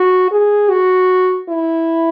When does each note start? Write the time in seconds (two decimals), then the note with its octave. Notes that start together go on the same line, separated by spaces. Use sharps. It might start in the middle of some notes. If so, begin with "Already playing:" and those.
Already playing: F#4
0.31 G#4
0.70 F#4
1.49 E4